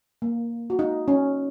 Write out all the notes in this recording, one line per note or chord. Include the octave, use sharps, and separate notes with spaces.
A#3
F#4
D#4
C#4